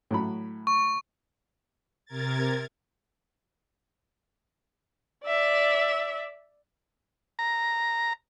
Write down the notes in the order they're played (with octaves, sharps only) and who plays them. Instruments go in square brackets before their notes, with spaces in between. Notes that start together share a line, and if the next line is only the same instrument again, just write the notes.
[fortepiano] A2 F#3 B5
[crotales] C#6
[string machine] C3 A#4 G#6 A6
[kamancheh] D5 E5
[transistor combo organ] A#5